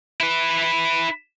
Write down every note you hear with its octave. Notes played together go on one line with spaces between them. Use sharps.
E4 B4